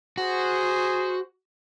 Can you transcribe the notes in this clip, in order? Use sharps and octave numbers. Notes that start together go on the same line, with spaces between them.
F#4 G#4 C5